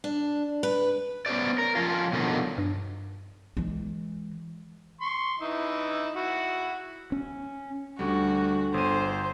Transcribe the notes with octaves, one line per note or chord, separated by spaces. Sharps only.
D4
B4
B3 C#4 A4 C5 D5
A#4
F3 C#4 F4
B2 D3 D#3 F3 F#3
G2
E3 G#3
C6 C#6
E3 D#4 E4
E4 F#4
C#4
D2 G3 D4 F#4 A4 G#5
G1 C5 D#7